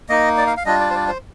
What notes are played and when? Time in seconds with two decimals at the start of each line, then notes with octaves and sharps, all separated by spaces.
0.09 A#3 D#4 D#5
0.38 D5
0.47 F5
0.57 F5
0.65 G3 D4 F4 D#5
0.80 D5
0.90 C5
0.94 D5
1.08 C5